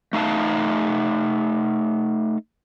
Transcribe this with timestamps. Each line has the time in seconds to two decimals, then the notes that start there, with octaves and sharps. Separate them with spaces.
0.13 A3 D#4 F5 A5